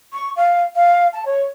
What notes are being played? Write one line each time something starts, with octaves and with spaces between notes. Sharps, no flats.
C#6
F5
F5
A5
C#5